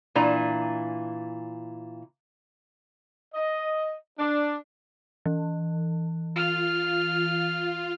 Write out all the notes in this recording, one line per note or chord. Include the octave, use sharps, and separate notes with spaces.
A#2 E3 D4 A#5
D#5
D4
E3
F4 F6